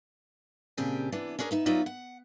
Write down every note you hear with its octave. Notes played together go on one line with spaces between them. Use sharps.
A#2 C#3 C4 D4 G4 G#5
C3 E3 B3 D4
C#4 D4 G#4 A#4
B3 D#4 E5
F#3 B3 D#4 F4 D5 E5
F#5